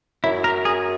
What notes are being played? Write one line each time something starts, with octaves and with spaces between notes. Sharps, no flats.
F#2 E4
A#4
G#4